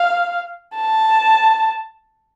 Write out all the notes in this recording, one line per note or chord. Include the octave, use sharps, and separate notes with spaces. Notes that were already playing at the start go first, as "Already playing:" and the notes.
Already playing: F5
A5